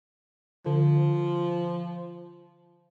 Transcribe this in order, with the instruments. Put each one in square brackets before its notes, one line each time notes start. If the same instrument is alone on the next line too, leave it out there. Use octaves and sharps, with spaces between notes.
[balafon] D3 [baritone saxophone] F3